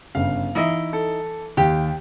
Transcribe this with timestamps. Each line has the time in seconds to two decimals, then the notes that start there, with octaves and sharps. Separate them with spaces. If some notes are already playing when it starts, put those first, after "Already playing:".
0.15 G1 C#3 F5
0.55 E3 D#4 E4 D#5
0.93 A4
1.57 D#2 G4